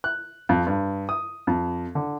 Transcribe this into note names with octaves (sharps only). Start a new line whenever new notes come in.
F#6
F2
G2
D#6
F2
D3